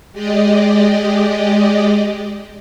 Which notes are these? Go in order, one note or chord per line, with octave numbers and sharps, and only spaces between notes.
G#3 G4 D5 D#5